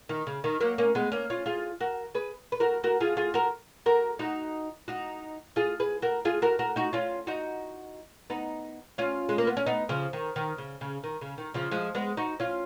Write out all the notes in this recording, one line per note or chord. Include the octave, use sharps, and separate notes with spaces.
D#3
C#3
D#3
F#3 A#3
A#3 C#4
G#3 B3
A#3 C#4
C#4 F4
F4 G#4
F#4 A#4
G#4 B4
B4
F#4 A#4
F#4 A#4
F4 G#4
F4 G#4
F#4 A#4
F#4 A#4
D#4 F#4
D#4 F#4
F4 G#4
G#4 B4
F#4 A#4
F4 G#4
F#4 A#4
F#4 A#4
D#4 F#4
C#4 F4
D#4 F#4
B3 D#4
C#4 F4
G#3
A#3
B3
C#4
B3 D#4
C#3 F3
D#3
D#3
C#3
C#3
D#3
C#3
D#3
C#3 F3
F3 G#3
G#3 B3
D#4 F#4
C#4 F4